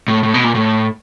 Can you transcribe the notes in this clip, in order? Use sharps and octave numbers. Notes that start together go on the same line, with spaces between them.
A2
A2
B2
A#2
A2